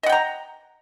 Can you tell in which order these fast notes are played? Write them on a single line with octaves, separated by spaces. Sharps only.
D#5 F#5 G5 A#5